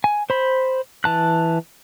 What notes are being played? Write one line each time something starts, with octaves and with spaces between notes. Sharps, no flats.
G#5
C5 B5
E3 A5 F#6